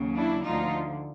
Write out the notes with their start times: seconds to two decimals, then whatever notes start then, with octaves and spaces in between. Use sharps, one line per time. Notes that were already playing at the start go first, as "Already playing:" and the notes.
Already playing: D#2 C#3 F#3
0.18 D4 E4
0.46 D2 D3 F3 D#4 F4